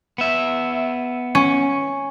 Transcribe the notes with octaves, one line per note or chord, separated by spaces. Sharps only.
B3 E5
C#4